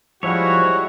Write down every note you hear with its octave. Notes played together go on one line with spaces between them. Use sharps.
F3 G3 G#3 E4 F#4 C#5